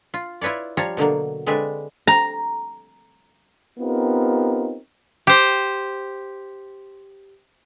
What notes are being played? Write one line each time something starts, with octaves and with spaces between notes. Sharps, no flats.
F4
E4 F4 B4 C#5 D5
F3 G3 F4 C#5 A5 A#5
B2 D3 F#3 A#3
D3 G#3 C4 B4 D5 E5
A#5
B3 C4 D#4 F4 G4 A#4
G4 C5